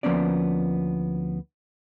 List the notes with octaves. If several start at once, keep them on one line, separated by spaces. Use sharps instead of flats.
D2 F3 A#3 B3 C#4 D5